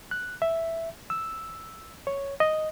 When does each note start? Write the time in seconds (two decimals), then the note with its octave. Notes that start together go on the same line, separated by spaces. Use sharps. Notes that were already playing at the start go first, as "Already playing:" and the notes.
0.11 F#6
0.42 E5
1.10 E6
2.07 C#5
2.40 D#5